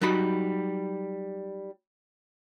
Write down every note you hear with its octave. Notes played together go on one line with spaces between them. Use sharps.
F#3 G3 D#4 B5